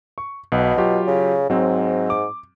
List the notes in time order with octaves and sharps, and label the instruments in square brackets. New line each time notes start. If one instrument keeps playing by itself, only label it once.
[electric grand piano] C#6
[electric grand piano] B1 [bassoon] B2
[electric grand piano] F#3 F4 G4
[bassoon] C#3
[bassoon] G#2 [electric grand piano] F#3 C4
[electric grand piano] D6